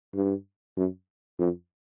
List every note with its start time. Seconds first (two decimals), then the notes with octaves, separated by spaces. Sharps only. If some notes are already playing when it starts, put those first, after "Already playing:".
0.14 G2
0.77 F#2
1.39 F2